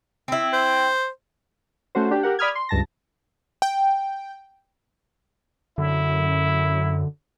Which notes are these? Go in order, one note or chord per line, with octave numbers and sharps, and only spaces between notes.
C4 E4
C5
A3 C#4 F#4 C5
D4 G4
G4 A#4 F#5
D5 B5 D#6 F6 G#6
C6
C#2 G2 A5 A#6
G5
F#2 D3 E4